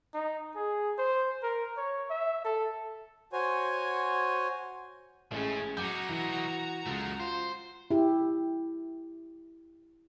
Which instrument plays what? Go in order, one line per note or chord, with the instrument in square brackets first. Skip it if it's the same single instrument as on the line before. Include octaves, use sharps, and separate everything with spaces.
[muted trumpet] D#4
G#4
C5
A#4
C#5
E5
A4
[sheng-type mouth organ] F#4 C5 C#5 G#5
[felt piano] A1 [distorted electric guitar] A2 A3 [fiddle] G#3 C#4
[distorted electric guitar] F#3 D#4 [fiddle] F#4 A#5 [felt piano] F#5 D6 G6
[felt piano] E3
[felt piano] C#2 [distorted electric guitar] G#3 A3
[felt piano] F4 [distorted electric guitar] C5
[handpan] E4 G4